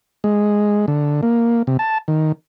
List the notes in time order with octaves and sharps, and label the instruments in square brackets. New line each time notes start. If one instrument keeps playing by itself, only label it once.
[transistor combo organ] G#3
D3
A#3
C3
A5
D#3